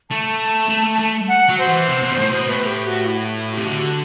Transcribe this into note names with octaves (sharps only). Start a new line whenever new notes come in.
A3 A5
A3
A3
A3
F#5
F#3
C5
E3
C3
B2
G2
A2
B2
A2 B4
G4
F#4
E4
C3 G4
D3 F#4